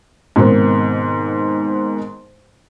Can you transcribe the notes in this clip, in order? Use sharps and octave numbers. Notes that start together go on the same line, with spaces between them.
G#2 B2 D#3 C4